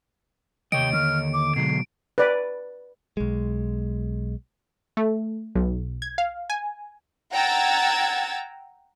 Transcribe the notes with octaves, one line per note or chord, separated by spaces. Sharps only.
D#2 C3 C#5 D#5 G5 D7
D3 F6
D6
B2 F#3 G#3 C7
B4 D5
B1 G#3
A3
B1
G#6
F5
G#5
F#5 G5 A#5 E6 G#6 A6